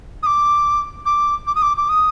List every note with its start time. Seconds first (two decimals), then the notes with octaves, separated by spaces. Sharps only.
0.23 D#6
0.26 D6
1.06 D6
1.47 D6
1.55 D#6
1.62 D6
1.77 D6
1.89 D#6